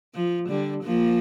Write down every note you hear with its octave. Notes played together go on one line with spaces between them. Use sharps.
F3
D3 G3
F3 A#3